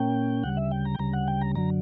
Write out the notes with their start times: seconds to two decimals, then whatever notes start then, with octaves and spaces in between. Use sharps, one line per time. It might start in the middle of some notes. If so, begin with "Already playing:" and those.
Already playing: A#2 A#3 C#4 G5
0.43 D2 C#3 G3 F#5
0.57 E5
0.71 G5
0.85 A#5
0.94 G5
0.99 D2 C#3 G3 A#5
1.13 F#5
1.28 G5
1.41 A#5
1.55 F#2 D3 F#3 A#5